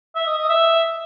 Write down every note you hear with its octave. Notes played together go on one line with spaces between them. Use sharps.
E5
D#5
D#5
E5